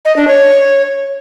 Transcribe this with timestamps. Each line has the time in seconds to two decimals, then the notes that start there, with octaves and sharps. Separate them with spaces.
0.05 D#5
0.16 D4
0.27 C#5